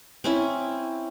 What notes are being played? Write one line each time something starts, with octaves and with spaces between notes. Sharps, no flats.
C4 C#4 E4